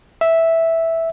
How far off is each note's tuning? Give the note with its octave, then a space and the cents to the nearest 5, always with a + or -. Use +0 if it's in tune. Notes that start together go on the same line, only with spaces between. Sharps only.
E5 -5